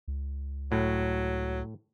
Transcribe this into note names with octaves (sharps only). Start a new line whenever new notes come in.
C#2
A2 F#3